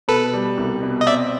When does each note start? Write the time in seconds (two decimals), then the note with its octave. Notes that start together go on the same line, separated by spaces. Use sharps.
0.08 B2 A4 B4
0.33 G3
0.57 C2
0.82 B2
1.01 D#5
1.07 C4 D5 E5